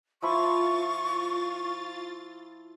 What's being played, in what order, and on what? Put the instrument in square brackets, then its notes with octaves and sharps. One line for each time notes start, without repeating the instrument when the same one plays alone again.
[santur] F3 E4 B5 [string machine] F4 A6 [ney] C#6